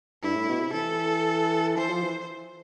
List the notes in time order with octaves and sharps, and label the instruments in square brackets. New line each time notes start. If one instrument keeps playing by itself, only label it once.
[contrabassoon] G2 [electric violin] E4
[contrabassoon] A2
B2
C3
[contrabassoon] E3 [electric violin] A4
[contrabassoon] E3 [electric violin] C5
[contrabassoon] F3
E3